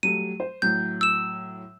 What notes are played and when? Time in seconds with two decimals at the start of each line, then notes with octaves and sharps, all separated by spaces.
0.03 F#3 G3 A3 D#7
0.40 C5
0.62 A2 F#3 G6
1.01 E6 E7